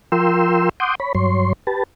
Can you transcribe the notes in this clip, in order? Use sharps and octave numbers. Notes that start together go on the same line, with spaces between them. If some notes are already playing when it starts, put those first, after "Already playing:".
F3 F4 A#4 G5 C6 E6
F#5 C6 D6 D#6 G6
C#5 B5
G2 F#3 C#5 C6
G4 B4 A5